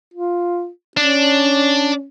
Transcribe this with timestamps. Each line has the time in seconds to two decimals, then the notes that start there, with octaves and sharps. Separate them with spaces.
0.13 F4
0.97 C#4 D4